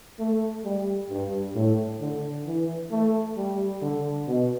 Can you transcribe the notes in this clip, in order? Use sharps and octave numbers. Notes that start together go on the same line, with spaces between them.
A3
G3
G2
A2
D3
E3
A3
G3
D3
B2